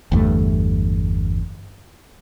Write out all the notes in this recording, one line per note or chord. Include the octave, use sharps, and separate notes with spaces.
G1 E2 G2 A3